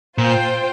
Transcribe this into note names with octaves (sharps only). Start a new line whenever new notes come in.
A#2 F4 C5 G5